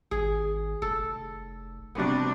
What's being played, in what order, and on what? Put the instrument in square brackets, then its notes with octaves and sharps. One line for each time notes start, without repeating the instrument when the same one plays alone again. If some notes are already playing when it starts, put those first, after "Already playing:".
[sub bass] G#1 [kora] G#4
[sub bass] F1 [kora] A4
[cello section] C3 G3 D4 [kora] B3 F#4